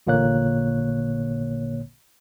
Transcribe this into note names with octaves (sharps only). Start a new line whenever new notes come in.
A1 A#2 D3 A#3 C#5 F#6